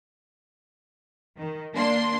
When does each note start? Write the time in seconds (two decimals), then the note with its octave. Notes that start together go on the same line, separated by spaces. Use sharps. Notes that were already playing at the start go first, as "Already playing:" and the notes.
1.39 D#3
1.74 A#3 D4 C6